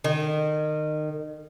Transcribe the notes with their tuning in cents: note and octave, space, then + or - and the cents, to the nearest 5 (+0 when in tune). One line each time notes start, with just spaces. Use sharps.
D#3 -25